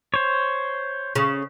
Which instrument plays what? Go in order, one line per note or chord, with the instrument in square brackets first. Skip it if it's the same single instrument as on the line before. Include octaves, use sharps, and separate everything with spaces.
[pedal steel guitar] C5 C#5
[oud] C#3